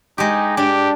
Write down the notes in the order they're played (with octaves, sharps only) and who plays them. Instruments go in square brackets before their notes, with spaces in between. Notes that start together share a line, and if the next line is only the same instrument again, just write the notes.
[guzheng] G#3 G4 [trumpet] D#4
[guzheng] D4 [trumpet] G4